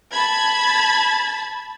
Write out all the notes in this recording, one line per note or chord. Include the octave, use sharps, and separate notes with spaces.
A5 B5 G#6